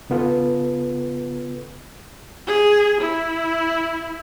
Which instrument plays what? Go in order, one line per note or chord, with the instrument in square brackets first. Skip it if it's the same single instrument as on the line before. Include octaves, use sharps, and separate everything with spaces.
[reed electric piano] C#3 B3 F4 A4 B4
[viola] G#4
E4